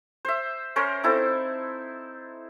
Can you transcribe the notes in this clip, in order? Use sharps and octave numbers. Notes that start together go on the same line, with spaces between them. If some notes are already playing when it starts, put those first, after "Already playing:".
C5 E5
C#4 A#4 C5 C#5
C4 D#4 E4 A4